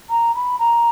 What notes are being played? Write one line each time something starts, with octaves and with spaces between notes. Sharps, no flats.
A#5
B5
A#5